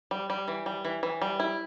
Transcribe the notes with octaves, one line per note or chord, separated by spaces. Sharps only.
G3
G3
E3
G3
E3
E3
G3
E4